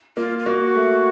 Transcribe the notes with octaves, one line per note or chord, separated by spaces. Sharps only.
A#3 F4
F4
A#3 F#4
A3